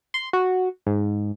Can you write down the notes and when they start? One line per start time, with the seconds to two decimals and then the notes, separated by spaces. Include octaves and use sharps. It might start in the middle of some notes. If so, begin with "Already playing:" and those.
0.14 C6
0.33 F#4
0.86 G#2